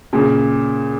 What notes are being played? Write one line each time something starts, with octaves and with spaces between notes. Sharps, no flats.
A#2 C#3